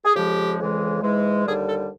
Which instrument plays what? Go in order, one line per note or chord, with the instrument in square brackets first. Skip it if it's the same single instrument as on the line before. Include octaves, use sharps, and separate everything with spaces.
[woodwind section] G#4
F2 C#3 F3 G#3 G4
F2 C#3 E3 G#3
G#2 E3 G#3
D#2 D3 G3 G#4
A4